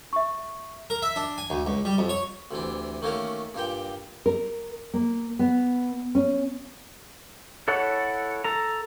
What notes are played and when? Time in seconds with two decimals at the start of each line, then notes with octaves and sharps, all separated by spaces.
0.13 E5 C#6
0.90 A#4
1.02 E5
1.16 D4
1.38 G#5
1.50 D2
1.66 C#2
1.85 G3
1.98 F2
2.09 C#5
2.51 D2 C3 E3 D4
3.02 D#3 A3 A#3 C#4 F#4 A#4
3.55 G2 A#2 G4 G5
4.26 A#4
4.94 A#3
5.39 B3
6.15 C#4
7.68 E4 A4 C#5 F#5
8.44 A4 A#5